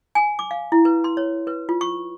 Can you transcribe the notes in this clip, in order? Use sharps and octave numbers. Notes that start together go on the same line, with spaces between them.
G#5
D6
F5
E4
B4
C6
C#5
B4
F4
C#6